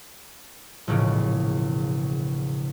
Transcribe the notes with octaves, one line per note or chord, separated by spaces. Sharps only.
E1 A#1 A2 C#3